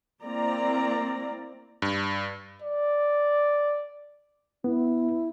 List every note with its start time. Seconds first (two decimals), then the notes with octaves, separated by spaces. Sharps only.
0.24 A#3 C4 E4 D5 A#5
1.82 G2
2.62 D5
4.64 B3 E4